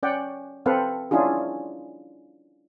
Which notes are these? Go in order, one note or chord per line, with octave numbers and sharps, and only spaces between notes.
C#4 D5 F#5 G5
C4 A4 B4 F5 F#5
C#4 D4 E4 F4 G#4